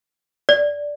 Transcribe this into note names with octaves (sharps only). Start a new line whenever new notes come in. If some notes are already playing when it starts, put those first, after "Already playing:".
D5